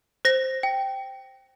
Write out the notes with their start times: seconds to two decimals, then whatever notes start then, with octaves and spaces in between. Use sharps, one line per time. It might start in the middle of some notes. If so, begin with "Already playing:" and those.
0.25 C5 A#6
0.63 G5